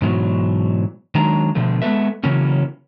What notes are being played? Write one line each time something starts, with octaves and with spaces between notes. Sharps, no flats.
G#2 B2 E3 F#3
D#3 F#3 G#3 D4 A#5
B2 D3 F3 A3
G#3 B3 C#4 A4 B4 E5
C#3 E3 F#3 A#3 C#4